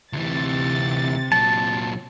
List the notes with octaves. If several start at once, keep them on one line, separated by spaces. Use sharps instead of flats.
D2 C3 E3 A6
A#2 F#3 A5